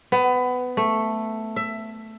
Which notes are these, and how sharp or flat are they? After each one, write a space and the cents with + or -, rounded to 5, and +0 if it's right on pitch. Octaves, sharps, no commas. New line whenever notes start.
B3 +20
A3 +5
E5 +15